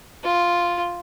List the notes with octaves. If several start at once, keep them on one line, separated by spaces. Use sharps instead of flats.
F4